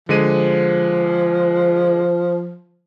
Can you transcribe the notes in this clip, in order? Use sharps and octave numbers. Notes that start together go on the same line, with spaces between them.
D3 F3 G#3 D#7